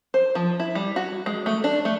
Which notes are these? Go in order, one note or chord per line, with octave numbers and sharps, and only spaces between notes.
C5
F3
E4
G3
F#4
G#3
A3
D4
A3